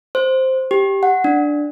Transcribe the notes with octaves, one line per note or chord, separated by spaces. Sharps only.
C5
G4
F#5
D4